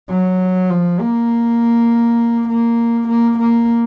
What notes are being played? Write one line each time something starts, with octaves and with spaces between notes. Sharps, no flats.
F#3
F3
A#3
A#3
A#3
A#3